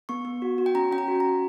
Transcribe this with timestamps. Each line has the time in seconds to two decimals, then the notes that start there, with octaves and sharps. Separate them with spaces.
0.09 B3 C#6
0.25 B3
0.42 F#4
0.58 F#4
0.66 G5
0.75 C#4 A#5
0.92 C#4 G5
0.98 A#5
1.08 F#4
1.20 A#5
1.25 F#4